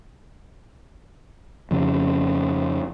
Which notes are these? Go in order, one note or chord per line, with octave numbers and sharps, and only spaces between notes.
F2 C#3 C#4